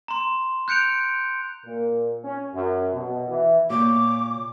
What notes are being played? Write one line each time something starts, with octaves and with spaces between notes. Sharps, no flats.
A#5 C6
F#6 G6 C#7 D7 F7
A#2
C#4
F#2
B2
E3
A#2 C#5 D6